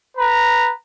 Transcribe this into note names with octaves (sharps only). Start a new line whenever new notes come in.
B4 A#5